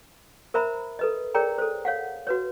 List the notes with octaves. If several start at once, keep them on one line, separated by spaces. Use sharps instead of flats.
A#4 C5 E5 A#5 B5
A4 B4 D#5
G#4 A#4 C#5 D5 G5 A#5
A4 C5
C#5 F5 F#5
F#4 B4 C#5